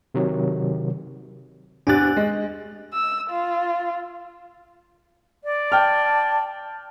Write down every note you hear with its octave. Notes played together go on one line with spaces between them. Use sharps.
C3 D#3 F#3
E2 C3 D4 F#6 A6
G#3
E6
F4
D5
G5 A5 F6